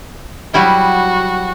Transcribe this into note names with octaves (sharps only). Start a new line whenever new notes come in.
F#3 G3 E4 F#4